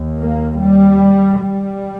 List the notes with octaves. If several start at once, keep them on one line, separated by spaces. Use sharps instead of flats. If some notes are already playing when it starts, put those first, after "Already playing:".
Already playing: D#2
A#3
G3
G3